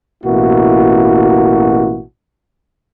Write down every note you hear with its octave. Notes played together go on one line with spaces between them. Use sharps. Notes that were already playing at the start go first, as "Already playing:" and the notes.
A1 B2 A#3 E4 F#4